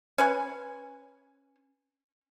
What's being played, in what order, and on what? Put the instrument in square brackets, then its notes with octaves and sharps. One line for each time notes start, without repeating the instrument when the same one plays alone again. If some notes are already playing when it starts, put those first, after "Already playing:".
[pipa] C#4 B4 G#5